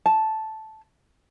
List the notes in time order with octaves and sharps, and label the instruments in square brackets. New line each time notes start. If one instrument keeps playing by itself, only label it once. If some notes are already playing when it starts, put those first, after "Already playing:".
[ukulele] A5